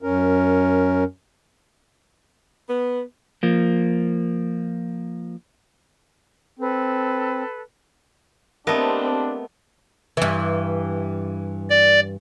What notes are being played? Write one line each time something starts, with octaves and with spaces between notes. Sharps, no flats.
F#2 C#4 A#4
B3
F3 A#3
C4 A4 B4
A3 B3 C4 D4 G4 A#4 D#5
G2 E3
D5